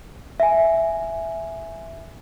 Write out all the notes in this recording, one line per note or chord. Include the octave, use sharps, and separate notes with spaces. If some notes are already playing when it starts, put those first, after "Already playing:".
E5 G#5